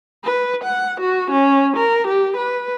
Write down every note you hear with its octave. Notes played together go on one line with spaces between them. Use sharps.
B4
F#5
F#4
C#4
A#4
G4
B4